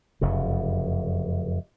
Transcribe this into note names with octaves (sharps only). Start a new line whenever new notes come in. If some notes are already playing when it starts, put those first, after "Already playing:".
F1 F#2 C#3